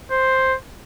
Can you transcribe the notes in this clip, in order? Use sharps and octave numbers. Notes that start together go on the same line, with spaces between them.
C5